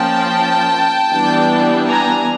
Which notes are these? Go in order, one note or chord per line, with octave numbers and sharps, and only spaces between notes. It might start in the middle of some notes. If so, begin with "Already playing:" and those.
Already playing: F3 A#3 C#4 G5 A5
E3 G3 B3 D4
G#5 A#5